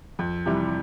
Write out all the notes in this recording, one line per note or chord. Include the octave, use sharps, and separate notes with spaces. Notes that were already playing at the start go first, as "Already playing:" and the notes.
F2
C3 E3 G3